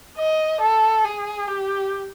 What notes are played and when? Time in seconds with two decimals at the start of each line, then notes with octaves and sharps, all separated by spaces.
0.18 D#5
0.61 A4
1.05 G#4
1.48 G4